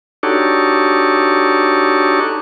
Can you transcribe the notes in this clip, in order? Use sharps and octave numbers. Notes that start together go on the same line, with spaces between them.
D4 D#4 F#4 G4 A4 C#5